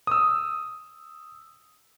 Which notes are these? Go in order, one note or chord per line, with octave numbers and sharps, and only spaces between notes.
D#6 E6